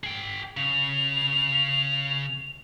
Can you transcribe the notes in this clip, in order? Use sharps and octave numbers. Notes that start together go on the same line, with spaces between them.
G#4 G5
C#3 F7